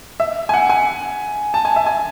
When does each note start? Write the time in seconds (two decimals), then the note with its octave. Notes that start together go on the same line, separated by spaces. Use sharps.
0.20 E5
0.49 G#5
0.54 F#5
0.69 G#5
1.54 A5
1.65 G#5
1.76 E5
1.86 G#5